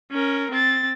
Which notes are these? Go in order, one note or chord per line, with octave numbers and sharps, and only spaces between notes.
C#4 A#4
C4 A6